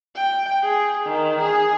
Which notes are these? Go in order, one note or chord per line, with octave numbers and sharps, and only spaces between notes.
G5
G#4
D#3
G#4